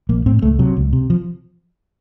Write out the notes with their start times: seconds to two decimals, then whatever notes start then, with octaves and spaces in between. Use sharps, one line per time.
0.09 A#1 A#3
0.26 A2 C4
0.42 C#2 A3
0.59 C3 F#3
0.77 C#2
0.93 C3
1.10 F3